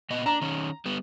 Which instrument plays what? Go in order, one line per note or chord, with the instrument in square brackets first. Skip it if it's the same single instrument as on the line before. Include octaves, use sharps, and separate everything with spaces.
[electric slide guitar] A#2 B3 D#5
[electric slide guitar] D4 [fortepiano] A#5
[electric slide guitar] D#3 C#4
G3 B3